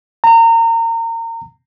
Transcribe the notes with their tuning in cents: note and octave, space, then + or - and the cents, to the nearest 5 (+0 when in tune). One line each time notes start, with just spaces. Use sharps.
A#5 -30